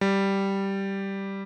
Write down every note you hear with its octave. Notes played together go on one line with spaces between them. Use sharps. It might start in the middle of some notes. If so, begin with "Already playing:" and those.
G3